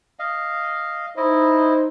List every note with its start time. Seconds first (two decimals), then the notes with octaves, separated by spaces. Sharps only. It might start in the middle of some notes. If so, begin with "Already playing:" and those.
0.19 D#5 F5
1.17 D#4 E4 C5 D#5